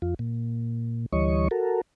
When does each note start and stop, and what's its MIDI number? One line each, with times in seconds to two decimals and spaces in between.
0.02 0.14 41
0.02 0.14 65
0.19 1.06 46
1.12 1.48 38
1.12 1.48 52
1.12 1.48 55
1.12 1.48 73
1.12 1.48 75
1.12 1.48 85
1.51 1.81 66
1.51 1.81 69
1.51 1.81 70